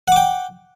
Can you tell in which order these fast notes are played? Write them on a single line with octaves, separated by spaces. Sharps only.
F#5 D6 G5